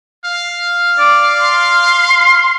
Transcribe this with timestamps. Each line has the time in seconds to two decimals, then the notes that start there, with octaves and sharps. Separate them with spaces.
0.25 F5
0.99 D5
1.41 C6